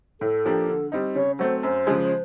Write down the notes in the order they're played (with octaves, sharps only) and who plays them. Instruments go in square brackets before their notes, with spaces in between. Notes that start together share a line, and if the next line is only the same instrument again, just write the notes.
[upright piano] A2 [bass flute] A4
[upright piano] F3 A#3 D4 G4
D3
G3 C4 D#4
[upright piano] C#3 [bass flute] C#5
[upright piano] F#3 A3 C4 [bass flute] C5
[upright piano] F#2 [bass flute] C5
[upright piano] C#3 F3 G#3